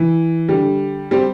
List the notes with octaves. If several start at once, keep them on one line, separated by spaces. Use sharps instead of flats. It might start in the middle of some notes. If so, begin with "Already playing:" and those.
Already playing: E3
D3 G3
G3 C4